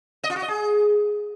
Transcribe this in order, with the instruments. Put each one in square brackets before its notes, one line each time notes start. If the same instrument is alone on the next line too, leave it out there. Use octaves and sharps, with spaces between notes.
[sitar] D#5
F4
F#4
D#5
G#4